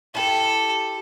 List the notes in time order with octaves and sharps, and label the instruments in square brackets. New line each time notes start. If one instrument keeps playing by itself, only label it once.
[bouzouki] E4 G4 [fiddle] A4